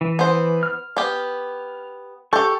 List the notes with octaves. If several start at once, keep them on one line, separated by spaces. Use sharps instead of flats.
E3
B3 C5
F6
B3 G4
G4 A4 C#6 G6